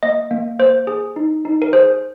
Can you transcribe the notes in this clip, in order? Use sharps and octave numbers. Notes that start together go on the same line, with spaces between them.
A#3 D#5
A#3
A#3 C5
G#4
D#4
D#4
A#4
G#4 C5